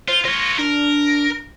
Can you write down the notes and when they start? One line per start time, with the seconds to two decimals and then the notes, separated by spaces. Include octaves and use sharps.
0.08 F4 C5
0.25 F4 C#5 A#6
0.59 D4 A#4